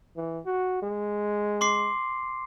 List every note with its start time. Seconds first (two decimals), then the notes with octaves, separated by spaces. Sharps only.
0.16 E3
0.45 F#4
0.82 G#3
1.61 C6 D6 C7